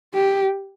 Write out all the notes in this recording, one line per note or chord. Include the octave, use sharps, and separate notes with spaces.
G4